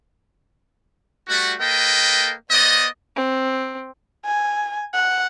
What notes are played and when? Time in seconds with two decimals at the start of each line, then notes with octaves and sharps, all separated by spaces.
1.29 G3 A3 F#4
1.60 A#3 A4 B4 D#5 G5
2.51 B3 C5 D5 D#5
3.16 C4
4.25 G#5
4.94 F#5